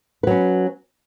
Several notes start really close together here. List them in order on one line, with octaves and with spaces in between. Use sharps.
B4 F#3 C#4